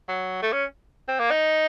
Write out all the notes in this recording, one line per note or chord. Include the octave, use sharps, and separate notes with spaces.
F#3
A3
C#4
C4
A#3
D#4